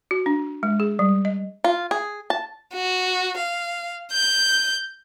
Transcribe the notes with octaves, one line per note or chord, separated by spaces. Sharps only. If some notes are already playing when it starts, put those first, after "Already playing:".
F#4
D4
G#3
G#4
G3
D#5
F4
G#4
A5
F#4
F5
G6